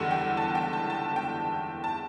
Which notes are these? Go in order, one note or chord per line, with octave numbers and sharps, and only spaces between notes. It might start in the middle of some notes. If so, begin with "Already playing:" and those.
Already playing: F#1 E2 D3 G3 F#5
G5
A5
G5
A5
A5
G5
A5